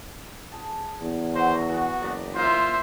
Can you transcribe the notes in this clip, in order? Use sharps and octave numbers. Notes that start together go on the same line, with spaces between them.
G#4 A5
E2
E3 F#3 F#4 C5
E3 B3 F#4
F#1 B4 D5 A#5
A#3 F4 C5 E5